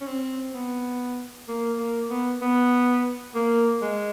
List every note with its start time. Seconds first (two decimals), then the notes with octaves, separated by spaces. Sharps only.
0.01 C#4
0.07 C4
0.53 B3
1.48 A#3
1.78 A#3
2.10 B3
2.41 B3
3.35 A#3
3.81 G#3